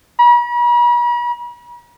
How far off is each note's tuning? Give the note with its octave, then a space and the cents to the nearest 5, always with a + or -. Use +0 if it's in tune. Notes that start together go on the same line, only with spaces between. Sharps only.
B5 -45